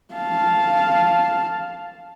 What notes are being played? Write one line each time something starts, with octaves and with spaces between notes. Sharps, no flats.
F5 A5